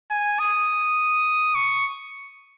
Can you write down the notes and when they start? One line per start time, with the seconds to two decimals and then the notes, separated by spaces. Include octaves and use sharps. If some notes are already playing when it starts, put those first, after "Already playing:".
0.10 G#5
0.39 D#6
1.55 C#6